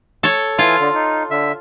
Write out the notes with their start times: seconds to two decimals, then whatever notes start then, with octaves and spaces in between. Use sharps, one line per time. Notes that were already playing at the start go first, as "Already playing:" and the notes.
0.23 A4 C#5
0.58 E3 F4 G#5 F6
0.80 D3
0.94 D#4
1.31 D3 E5